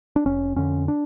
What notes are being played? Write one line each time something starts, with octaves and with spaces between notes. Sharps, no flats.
D4
F1 C#4
F2 D3 C#4
D4